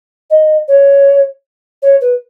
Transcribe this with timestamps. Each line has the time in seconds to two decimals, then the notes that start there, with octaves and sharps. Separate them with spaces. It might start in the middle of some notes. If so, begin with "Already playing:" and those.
0.30 D#5
0.68 C#5
1.82 C#5
2.01 B4